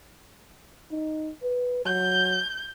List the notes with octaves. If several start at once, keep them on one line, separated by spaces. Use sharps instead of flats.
D#4
B4
F#3 G6